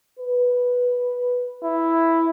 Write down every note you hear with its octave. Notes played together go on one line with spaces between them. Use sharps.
B4
E4